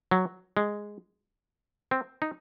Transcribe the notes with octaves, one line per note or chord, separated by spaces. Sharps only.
F#3
G#3
C4
D#4